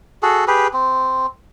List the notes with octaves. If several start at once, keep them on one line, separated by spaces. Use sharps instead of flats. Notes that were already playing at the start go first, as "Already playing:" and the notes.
F#4 G#4 A4
G4 G#4 B4
C4